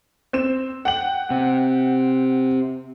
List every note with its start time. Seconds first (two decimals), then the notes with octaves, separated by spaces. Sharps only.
0.33 C4 E7
0.85 F#5 G5 F#7
1.30 C3